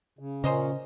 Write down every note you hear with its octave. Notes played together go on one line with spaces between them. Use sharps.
C#3
A#2 C#3 C#4 C5 D#5 A#5